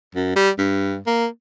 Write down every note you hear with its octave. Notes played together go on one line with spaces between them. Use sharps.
F#2
G3
G2
A#3